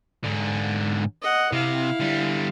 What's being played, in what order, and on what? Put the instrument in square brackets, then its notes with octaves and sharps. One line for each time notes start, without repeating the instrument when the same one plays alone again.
[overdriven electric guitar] G#2 D3
[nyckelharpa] D#5 F#5
[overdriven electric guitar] C3 [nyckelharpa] E4 F5
[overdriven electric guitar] D3 G3